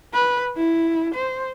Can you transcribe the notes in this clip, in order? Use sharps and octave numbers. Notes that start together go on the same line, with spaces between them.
B4
E4
C5